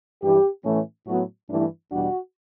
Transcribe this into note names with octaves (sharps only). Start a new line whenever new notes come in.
G2 E3 G3 G4
A2 E3 A3 C#4
A2 F#3 B3 F#4
G2 E3 A3 D4 E4
E2 B2 G3 D4 F#4